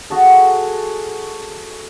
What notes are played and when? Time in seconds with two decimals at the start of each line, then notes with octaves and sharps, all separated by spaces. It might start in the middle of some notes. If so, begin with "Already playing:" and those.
0.10 F#4 G#4 A4